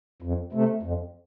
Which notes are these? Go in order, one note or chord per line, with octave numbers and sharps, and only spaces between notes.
F2
C3 A3
F2